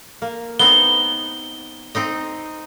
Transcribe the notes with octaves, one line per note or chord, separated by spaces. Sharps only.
A#3
B3 C4 D#4 G7
C4 D#4 D#5